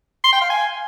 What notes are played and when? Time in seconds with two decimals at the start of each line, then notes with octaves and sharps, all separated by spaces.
0.24 C6
0.33 G5
0.41 F5
0.50 G#5